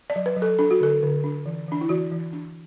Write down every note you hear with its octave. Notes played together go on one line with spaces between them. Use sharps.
D5
F#3
B4
F#3
A4
D4 A4
F#4
D3 A4
D3
D4
E3
E3 D4
E4
E3 F#4
E3
D4